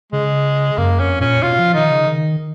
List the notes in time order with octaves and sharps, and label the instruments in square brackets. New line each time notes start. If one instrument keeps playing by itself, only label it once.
[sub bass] C#3 [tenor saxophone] G#3
[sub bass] F#2 [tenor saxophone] A#3
[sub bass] F2 [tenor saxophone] C#4
[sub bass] A#2 [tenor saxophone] C#4
[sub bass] B2 [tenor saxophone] F4
[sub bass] F3
[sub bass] D#3 [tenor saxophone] D#4
[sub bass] C#3
D#3